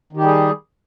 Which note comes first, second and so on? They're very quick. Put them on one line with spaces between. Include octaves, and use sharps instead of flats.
D#3 G4 G3 G#4